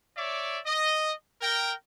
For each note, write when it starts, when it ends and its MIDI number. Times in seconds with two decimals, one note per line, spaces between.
0.17 0.59 73
0.17 0.59 74
0.17 0.59 76
0.17 0.59 86
0.66 1.12 75
1.42 1.72 70
1.42 1.72 79